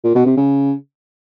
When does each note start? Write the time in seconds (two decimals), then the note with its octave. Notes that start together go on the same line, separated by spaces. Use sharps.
0.04 A#2
0.15 B2
0.26 C3
0.37 C#3